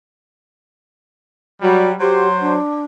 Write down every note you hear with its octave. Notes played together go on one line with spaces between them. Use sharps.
F#3 G3 F#4
F#3 G4 C5
D4